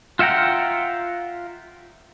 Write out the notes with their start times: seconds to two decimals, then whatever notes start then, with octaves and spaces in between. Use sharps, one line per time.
0.19 F4 E5 F#5 G5 A#5